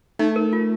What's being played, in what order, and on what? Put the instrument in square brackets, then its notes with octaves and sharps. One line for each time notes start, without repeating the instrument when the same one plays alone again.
[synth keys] A3 [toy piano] D#4
[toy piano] A#4
F4